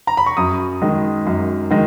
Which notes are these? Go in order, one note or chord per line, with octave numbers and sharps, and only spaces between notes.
A#5
B5
C#6
F#2 D#6
D#3 G#3
F#2
D#3 G#3